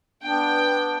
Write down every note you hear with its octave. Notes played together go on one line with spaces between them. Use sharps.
B3 D4 G5